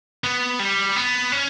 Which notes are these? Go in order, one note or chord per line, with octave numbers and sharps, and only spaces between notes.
B3
G3
B3
C#4